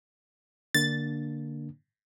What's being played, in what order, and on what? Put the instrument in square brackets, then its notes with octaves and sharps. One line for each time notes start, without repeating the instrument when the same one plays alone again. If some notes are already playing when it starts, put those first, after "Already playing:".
[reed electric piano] D3 A#3 D4 [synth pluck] A6